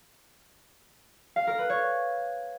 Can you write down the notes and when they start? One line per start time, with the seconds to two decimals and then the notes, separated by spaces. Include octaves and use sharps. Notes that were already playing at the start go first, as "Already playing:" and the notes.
1.36 F5
1.47 A#4
1.58 B4
1.70 C#5